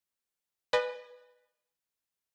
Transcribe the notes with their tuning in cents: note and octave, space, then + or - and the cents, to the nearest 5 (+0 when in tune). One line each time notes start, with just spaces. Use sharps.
B4 +0 D#5 -40 G#5 +0